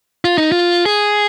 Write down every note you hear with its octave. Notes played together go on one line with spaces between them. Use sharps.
F4
D#4
F4
G#4